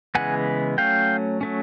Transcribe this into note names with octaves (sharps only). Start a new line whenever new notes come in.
C#3 E3 G#3 B3 F#5 G#5
F#3 A3 C#4 F5 G5
F#3 A3 C#4